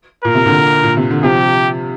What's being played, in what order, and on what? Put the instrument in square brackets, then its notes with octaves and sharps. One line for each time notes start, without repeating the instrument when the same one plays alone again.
[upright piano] A#2 [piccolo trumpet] A#4
[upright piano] C3
A#2 D3
A#2
C3
D3
[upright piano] C3 F3 [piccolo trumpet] G4